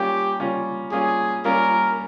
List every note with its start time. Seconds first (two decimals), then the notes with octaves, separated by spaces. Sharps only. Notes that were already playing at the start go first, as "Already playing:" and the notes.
Already playing: G3 A#3 C#4 F4 G4
0.40 G3 A#3 C#4 F4
0.92 G3 A#3 C#4 F4 G#4
1.45 G3 A#3 C#4 F4 A#4